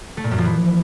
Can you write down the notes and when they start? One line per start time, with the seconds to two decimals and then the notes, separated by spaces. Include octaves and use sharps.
0.17 A3
0.24 A#2
0.31 F#2
0.38 F3
0.45 E3